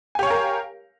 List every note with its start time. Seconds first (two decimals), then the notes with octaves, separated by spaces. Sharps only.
0.15 G#5
0.19 G4
0.23 C#5
0.27 F5
0.30 A#4